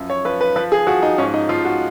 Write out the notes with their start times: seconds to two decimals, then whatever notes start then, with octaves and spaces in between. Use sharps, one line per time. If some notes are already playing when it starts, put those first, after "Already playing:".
Already playing: F#2 F3
0.10 C#5
0.25 F3 B4
0.41 B4
0.56 F3 B4
0.72 G#4
0.87 F3 F#4
1.03 D#4
1.18 G#2 C#4
1.34 D#4
1.49 F3 F4
1.65 F#4